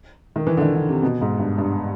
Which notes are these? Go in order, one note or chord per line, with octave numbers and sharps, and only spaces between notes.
D#3
E3
D3
D#3
D3
C3
B2
G#2
G2
G2